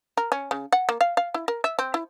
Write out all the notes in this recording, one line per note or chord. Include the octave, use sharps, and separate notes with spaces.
A#4
C#4
C#3
F#5
A#3
F5
F5
E4
A#4
E5
C4
E4